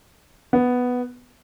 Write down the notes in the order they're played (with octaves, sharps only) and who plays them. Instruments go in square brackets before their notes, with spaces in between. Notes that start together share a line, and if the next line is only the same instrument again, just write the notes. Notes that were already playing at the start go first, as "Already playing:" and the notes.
[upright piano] B3